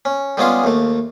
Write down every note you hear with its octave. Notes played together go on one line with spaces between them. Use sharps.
C#4
G3 G#3 B3 C#4 F4 G#4
D#2 A3